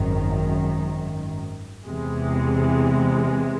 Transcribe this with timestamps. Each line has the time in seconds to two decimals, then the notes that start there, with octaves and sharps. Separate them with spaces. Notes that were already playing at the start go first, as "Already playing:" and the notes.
Already playing: G#1 F#2 D#3
1.85 E2 C3 E3 G#3